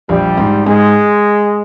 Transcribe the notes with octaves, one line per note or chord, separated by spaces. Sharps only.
A#1 G3
G#2
G#2 G#3